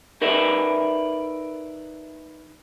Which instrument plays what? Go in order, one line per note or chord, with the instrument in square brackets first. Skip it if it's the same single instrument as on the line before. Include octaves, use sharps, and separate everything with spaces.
[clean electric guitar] D#4 A#4 B4 D5 E5